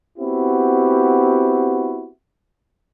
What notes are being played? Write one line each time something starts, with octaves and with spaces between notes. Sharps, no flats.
B3 C4 E4 F#4 G4